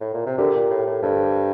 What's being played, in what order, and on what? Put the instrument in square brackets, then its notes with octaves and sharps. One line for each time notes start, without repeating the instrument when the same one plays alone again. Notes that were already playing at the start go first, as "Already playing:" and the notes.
[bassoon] A2
A#2
C3
[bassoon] D3 [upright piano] G4 A#4
[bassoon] A#2
A2
A2
[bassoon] G2 [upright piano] A4 C5